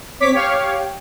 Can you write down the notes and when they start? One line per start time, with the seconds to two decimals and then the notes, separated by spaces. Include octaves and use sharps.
0.20 C4 C#5 D6 B6
0.33 G4 C#5 F5 G5